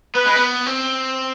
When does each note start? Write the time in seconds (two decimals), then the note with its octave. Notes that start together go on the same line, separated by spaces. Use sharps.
0.15 B3 B4
0.26 G#3
0.36 B3
0.66 C4